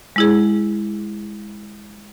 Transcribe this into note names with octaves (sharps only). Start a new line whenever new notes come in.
G#3 E4 G#4